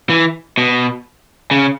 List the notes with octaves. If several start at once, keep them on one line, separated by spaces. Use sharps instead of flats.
E3
B2
C#3